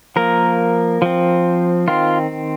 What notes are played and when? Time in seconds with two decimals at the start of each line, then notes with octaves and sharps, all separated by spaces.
0.16 F3 A#3 A#4
1.02 F3 C4
1.88 D#3 C4 F4